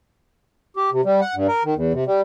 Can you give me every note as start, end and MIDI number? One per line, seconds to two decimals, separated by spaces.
0.76 0.90 67
0.92 1.01 48
1.05 1.21 55
1.21 1.35 78
1.35 1.47 43
1.48 1.63 70
1.64 1.74 51
1.76 1.93 40
1.93 2.04 48
2.06 2.21 55